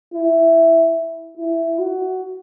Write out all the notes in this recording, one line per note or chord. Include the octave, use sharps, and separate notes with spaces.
E4
E4
F#4